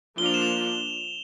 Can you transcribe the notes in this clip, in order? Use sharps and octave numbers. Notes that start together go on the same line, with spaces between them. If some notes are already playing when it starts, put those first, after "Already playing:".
F3 A#3 D4 F4 G7
F7
E7
F7